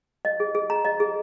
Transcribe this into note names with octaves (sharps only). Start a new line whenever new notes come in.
D#5
G#4
G#4
A#5
D#5
G#4